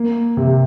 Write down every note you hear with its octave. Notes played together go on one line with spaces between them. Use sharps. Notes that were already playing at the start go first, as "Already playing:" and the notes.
Already playing: A#3
C3